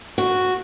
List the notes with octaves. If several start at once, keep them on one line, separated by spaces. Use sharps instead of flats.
F#4